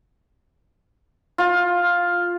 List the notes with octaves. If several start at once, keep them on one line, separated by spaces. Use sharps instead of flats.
F4